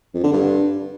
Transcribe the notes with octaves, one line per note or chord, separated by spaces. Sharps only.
F2
D3
G2